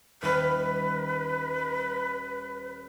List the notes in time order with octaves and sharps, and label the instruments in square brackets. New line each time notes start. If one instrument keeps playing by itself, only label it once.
[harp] D#1 F6 [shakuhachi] B4